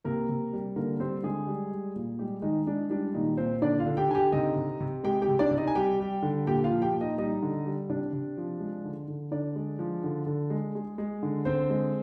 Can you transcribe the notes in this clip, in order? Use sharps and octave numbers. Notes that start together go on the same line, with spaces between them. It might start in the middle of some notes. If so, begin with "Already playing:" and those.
C3 A#3 A#4
C3
G3
D3 A#3 A#4
G3 C4 C5
D3 G#3 G#4
G3
G3
A#2
G3 G#3 G4
D#3 G#3 D#4
G#3 D4
G3 D4
A#2 D#3 D#4
A#2 C4 C5
D3 D4 D5
F4 F5
D3
G4 G5
D3 G#5
G4 G5
C3 D#4 D#5
C3
C3
G#3 G4 G5
G4 G5
C3
D4 D5
C3
D#4 D#5
G#5
G3 G4 G5
G3
D3
A#2 G4 G5
F4 F5
F3
G4 G5
A#2
D#4 D#5
G3 D#4 D#5
D3
G3
C3 D4 D5
C3
F3
G#3
D3
D3
D3 D4 D5
G#3
F3
D3
D3
G#3
G#3
G#3
D3
D3 C4 C5
G#3